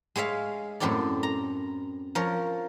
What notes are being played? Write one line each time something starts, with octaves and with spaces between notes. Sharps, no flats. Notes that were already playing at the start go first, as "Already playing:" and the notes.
G#3 G#4 C#5 E5 F5
F#2 A2 C4 A4 C#5 D5
A#5
F3 A#4 C#5